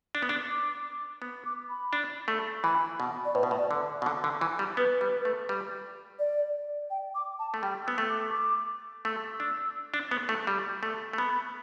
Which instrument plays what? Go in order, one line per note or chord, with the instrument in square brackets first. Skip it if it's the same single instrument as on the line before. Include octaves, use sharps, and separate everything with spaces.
[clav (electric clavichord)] D4
B3
D4
[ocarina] D6
[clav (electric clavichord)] B3
[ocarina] D6
B5
[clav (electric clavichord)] D4
A3
[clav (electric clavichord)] E3 [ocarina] B5
[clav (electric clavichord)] B2
[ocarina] D5
[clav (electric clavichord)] A2 [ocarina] B4
[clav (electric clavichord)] B2
A2
[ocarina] D5
[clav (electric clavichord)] D3
B2
D3
D3
E3
G3
[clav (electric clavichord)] B3 [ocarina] B4
[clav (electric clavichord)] G3
A3
G3
[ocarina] D5
G5
D6
A5
[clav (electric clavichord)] A3
[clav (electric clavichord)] G3 [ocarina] G5
[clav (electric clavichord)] B3 [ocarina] E6
[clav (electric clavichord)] A3
[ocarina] D6
D6
[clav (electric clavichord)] A3 [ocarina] E6
[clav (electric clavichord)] D4
D4
B3
A3
G3
A3
A3
[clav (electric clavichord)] B3 [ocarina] B5